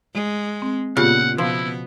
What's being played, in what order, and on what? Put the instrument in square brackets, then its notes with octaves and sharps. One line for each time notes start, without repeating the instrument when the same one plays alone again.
[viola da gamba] G#3
[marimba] C4
[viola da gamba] A#2 [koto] C#3 [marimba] B3 F4 G4 [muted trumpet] F#5
[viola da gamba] B2 B3 [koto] F3 [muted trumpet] E4 [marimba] F5